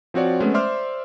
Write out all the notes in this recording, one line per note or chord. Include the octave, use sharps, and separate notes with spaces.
F3 C4 F#4 C#5 D5
G#3 A3 B3 C#4
C5 D5 E5 C6 D6 F6